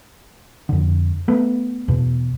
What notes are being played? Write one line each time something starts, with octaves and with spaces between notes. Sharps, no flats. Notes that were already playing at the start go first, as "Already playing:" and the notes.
F2 D3
A3 B3
E2 B2